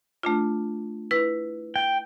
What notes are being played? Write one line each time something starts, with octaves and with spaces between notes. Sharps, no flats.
A3 D4 F4
E4 B4
G5